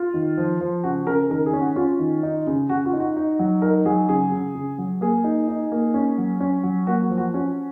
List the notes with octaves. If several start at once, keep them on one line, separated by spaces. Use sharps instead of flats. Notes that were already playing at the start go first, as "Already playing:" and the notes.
Already playing: F4
D#3
F3
F3
C#3 F#4
C#3 A#4
D#3 A#4
G#4
C#4
F#4
C#4 F4
D#3
D#4
C#3
C#3 F#4
F4
D#4
F#4
D#4
F#3
D#4 A#4
F#3 G#4
C#3 G#4
C#3
C#3
F#3
A#3 G#4
D#4
D#4
A#3
C#4
F#3
C#4
F#3
A#3 F#4
F3
F#4
C#4 F#4